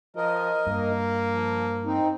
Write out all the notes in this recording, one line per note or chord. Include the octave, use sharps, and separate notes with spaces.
F3 A#4 D#5
G2 A#3
F3
C4 D#4